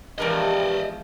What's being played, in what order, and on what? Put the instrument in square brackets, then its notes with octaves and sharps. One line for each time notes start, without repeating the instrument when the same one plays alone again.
[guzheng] E2 F3 G#3 [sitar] G2 A#4 [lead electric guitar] D5 D#5